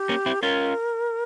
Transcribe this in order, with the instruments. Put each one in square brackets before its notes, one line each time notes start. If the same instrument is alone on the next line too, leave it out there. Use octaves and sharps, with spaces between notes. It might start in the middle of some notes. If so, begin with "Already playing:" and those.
Already playing: [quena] G4
[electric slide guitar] A#3 C#4
C4 E4
[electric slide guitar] C#4 F4 [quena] A#4